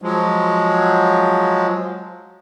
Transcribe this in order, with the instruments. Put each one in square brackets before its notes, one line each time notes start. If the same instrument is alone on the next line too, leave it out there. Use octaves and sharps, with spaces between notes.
[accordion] F3 F#3 G#3